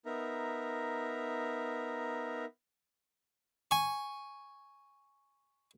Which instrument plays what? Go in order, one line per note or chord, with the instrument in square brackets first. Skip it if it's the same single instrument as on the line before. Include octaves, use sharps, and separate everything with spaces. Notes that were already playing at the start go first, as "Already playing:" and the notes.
[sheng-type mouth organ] B3 D#4 A#4 E5 A#5
[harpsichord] G#5 C#6